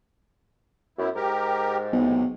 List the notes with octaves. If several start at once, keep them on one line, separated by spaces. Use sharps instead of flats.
F#2 B3 E4
G#2 G4 A#4
B1 A2 C3